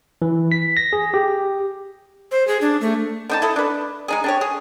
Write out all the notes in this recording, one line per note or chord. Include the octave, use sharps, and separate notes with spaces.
E3
B6
A#6
G#4
G4
C5
G#4
D4
A3
D3 D#4 A5
E4 A4 D#5
D4 B4
G#3 D#4 G#4
D4 G4 C#5
G#4